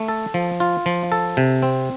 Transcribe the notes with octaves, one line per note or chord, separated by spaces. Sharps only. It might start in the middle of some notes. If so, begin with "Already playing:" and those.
Already playing: A3
A4
F3
F4
F3
A4
C3
C4